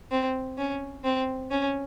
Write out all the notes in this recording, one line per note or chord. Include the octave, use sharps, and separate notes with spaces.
C4
C#4
C4
C#4